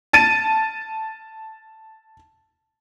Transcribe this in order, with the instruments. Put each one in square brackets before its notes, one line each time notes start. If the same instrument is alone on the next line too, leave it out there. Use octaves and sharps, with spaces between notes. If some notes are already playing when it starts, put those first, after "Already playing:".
[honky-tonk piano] A5 A6 D#7